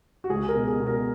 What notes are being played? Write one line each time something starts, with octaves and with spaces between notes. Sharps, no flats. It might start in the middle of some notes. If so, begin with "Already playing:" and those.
F#4
C#2 G#4
A#4
B2
G#4
B2
A#4